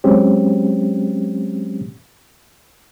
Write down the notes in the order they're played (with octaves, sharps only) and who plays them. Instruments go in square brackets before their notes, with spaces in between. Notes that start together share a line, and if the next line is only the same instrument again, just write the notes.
[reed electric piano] F#3 G#3 C4 C#4 G4